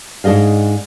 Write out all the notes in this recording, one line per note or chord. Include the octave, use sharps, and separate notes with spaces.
G#2 D4 G#4 D#5 F5